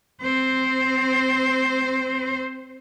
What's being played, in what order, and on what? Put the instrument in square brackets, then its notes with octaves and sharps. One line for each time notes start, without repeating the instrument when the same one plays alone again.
[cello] C4 C5